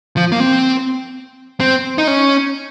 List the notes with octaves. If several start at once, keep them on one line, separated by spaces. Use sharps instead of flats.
F3
A#3
C4
C4
D#4
C#4